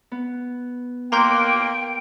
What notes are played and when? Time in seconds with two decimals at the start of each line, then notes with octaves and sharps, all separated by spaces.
0.12 B3
1.12 A#3 G5 A#5 C6 D6 F#6 G6